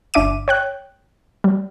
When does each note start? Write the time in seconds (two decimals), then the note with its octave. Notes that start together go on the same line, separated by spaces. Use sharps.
0.14 G1 D4 E5 D6 D#7
0.48 C#5 G5 F#6
1.44 G3